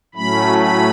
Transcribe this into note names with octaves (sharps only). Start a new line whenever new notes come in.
A2 F#3 A3 C#4 B5
B5